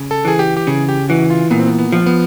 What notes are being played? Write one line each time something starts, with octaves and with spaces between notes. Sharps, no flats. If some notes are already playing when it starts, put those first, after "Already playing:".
Already playing: C#3
A4
E3 G#4
G4
G4
C#3 G#4
G4
E3 F#4
F4
A#2 B3
C4
B3
B3
F3
B3